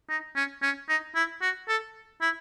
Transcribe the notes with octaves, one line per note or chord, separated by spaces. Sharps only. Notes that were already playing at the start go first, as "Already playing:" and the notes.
D#4
C#4
C#4
D#4
E4
F#4
A4
E4